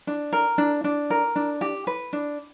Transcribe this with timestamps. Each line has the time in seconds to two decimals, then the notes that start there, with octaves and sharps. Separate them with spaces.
0.07 D4
0.33 A#4
0.58 D4
0.84 D4
1.10 A#4
1.36 D4
1.61 G4
1.87 B4
2.13 D4